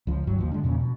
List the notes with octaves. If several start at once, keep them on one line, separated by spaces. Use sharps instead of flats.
C#2 F3
G1 G2 F#3
D#2 F3
D3 G#3
E2 A#2 C#3 F3
B2